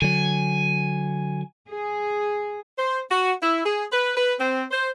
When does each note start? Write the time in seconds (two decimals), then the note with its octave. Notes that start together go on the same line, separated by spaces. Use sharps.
0.02 D3 F#3 G#5
1.69 G#4
2.78 C5
3.10 F#4
3.42 E4
3.65 G#4
3.92 B4
4.16 B4
4.40 C4
4.71 C5